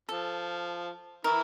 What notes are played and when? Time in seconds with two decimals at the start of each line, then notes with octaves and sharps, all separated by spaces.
0.09 F3 A4
1.24 E3 E4 A#4